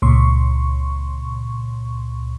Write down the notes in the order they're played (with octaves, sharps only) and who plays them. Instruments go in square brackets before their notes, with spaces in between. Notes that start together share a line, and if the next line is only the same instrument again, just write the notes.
[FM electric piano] C#2 A#2 C6 C#6